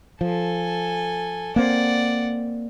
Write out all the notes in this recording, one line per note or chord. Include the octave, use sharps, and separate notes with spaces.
F3 A4 G#5
A#3 C4 D5 F#5